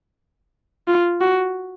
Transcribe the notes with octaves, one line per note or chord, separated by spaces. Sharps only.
F4
F#4